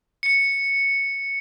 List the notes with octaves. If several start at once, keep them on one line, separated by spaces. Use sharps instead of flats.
C#7